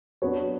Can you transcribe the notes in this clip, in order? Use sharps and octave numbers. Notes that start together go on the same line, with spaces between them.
F#3 B3 D4 B4 C#5